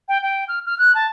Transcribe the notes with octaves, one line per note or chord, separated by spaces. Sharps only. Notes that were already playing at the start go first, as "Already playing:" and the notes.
G5
G5
F6
F6
F#6
A5